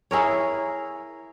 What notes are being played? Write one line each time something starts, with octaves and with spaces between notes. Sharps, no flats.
E4 G#4 A#4 C#5